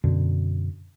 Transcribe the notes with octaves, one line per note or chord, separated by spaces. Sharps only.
F#2 B2 D3